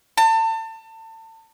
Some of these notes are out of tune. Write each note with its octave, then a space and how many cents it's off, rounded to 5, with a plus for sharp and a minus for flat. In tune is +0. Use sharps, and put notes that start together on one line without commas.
A5 +30